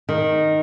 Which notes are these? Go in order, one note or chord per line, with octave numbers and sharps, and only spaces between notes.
D#3